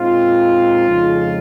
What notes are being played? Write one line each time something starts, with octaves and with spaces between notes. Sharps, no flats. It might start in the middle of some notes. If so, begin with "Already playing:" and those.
Already playing: A#2 G#3 C4 D#4 F4
F2 C#3 G#3 D#4